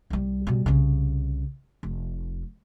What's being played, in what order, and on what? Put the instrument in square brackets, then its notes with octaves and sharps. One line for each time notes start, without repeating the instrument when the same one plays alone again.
[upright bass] C2 G3
B2 G3
C2 C#3
F1